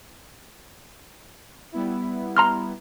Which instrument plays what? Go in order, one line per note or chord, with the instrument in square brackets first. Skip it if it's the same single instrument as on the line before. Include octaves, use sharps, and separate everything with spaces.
[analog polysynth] G3 B3 E4
[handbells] A#5 C6 F6